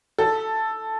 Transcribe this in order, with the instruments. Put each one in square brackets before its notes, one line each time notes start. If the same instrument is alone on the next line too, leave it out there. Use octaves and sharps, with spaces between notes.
[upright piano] A4